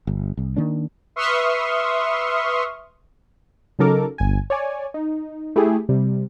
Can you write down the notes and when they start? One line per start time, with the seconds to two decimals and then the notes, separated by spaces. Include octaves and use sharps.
0.07 G1
0.37 C2
0.56 D#3 A#3 D4
1.16 B4 E5 C6 C#6 D#6 F6
3.79 C#3 F#3 D#4 A4 A#4 D6
4.18 G1 G#5
4.50 C#5 D5 G#5
4.94 D#4
5.56 A3 E4 G4 G#4
5.89 C3 G3